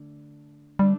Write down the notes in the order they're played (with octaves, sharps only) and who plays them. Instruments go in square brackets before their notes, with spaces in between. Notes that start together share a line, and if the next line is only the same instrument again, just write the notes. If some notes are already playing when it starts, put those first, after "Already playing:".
Already playing: [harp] D3 A3 D4
[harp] D3 A3 D4 [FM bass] G3